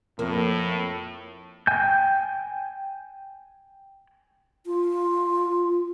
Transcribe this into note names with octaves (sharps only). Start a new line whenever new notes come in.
F2 A2 A#3
G5 G#5 G6
F4